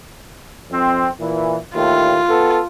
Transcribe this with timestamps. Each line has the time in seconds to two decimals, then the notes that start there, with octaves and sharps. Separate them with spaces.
0.71 F2 C4
1.19 A#2 E3
1.76 D#2 A2 A3 F4
2.28 B3 A4